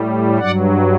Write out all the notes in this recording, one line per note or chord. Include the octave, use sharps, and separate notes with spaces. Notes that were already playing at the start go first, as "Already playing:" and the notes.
Already playing: A2 G3
G2 F#3 D5 F#5